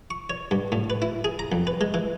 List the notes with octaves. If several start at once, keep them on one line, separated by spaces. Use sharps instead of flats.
C#6
C#5
G2
A2
B4
E4
G#4
A#5
F2
B4
G#3
E3